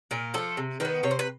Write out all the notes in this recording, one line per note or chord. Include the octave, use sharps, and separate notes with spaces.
A#2 A#4
F3 A3 A4
C3
D#3 G3 B3 B4
C3 C#5
C5
B4